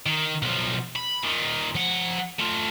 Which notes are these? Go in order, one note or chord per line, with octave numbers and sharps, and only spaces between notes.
D#3
B1 F3
B5
A#2 D#3
F3 F#5
A3 F4